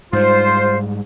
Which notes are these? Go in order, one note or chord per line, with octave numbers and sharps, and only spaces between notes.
G#2 G3 F4 C5